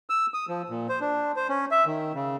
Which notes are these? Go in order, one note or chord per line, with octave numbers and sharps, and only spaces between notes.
E6
D#6
F3
A#2
C5
D4
C5
C#4
E5
D#3
C#3